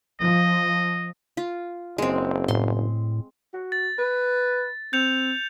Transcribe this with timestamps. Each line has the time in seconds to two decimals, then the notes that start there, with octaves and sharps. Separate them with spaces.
0.20 F3 D#5
1.37 F4
1.98 F#1 G#3 C4
2.48 A2 C6
3.54 F#4
3.72 A6
3.98 B4
4.93 C4 G6 C#7 F7